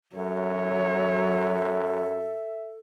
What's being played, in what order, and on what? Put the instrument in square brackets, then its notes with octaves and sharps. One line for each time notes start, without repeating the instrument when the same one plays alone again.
[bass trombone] F#2 [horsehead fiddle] F#3 C#5 [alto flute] A4 [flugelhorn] E5